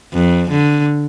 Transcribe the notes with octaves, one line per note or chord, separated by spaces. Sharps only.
F2
D3